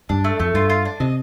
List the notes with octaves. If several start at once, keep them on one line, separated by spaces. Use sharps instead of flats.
G2 D4
A3
F2 A3
G2 F4
F4
D4
C3 D#5